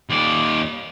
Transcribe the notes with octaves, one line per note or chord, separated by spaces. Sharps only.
D#2 D5